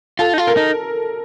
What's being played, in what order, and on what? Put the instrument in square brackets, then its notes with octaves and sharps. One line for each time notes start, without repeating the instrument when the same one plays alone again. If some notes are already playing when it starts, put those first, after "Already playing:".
[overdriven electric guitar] F4 [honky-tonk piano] A4
[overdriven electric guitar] D#4
F4
[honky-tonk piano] A#4
[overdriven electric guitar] D#4